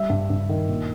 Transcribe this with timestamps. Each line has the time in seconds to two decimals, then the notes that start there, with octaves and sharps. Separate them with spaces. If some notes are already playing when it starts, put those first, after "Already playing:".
Already playing: G3 E5
0.10 G2
0.30 G2
0.49 D#3
0.69 A#2